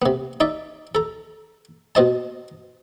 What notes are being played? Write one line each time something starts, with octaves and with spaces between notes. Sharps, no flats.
C3 B3
D#4 D5 E5
A4 A#5
B2 C5 D#5 A5